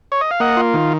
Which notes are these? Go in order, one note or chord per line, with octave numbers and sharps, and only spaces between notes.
C#5
D#5
F5
A#3 D#5 F#5
F4
D#3